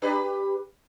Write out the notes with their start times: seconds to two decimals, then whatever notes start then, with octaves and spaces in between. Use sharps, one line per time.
0.02 D4 G4 B4